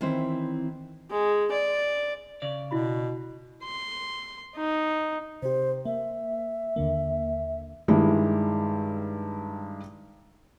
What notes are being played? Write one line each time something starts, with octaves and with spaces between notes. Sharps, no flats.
D#3 E3 C4 C#4 E4 C5
G#3
D5
C#3 D5
B2 E4 F#4 B5
C6
D#4
C3 G4 C5
A#3 E5
D#2 D3 A#3
G2 D#3 G3 G#3 E4